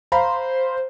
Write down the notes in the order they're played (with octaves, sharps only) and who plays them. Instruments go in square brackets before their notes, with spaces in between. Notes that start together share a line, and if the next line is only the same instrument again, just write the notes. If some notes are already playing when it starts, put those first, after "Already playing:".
[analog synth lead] C5 [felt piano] F5 A#5 B5